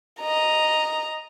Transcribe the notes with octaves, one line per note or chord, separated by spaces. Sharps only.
D#5 A#5